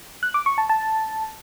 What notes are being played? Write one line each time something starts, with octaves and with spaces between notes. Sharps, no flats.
F#6
D6
C#6
A5
A5